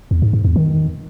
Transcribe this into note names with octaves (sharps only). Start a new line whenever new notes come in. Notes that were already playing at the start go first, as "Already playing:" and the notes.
E2
G#2
G#2
E2
D#3